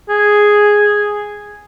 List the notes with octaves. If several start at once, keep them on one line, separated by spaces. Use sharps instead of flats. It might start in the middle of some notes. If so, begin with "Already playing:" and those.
G#4